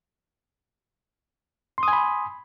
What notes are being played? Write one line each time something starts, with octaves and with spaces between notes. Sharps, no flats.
G#5 B5 C6 D#6